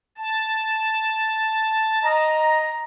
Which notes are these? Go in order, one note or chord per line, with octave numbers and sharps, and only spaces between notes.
A5
D#5 A#5